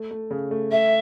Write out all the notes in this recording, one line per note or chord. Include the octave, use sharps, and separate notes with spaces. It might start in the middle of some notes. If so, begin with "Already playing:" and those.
Already playing: A3
A3
C#3
A3
A3 E5